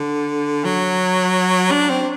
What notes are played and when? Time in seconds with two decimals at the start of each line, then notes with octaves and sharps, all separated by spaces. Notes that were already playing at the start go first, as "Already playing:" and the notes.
Already playing: D3
0.65 F#3
1.71 D4
1.90 C4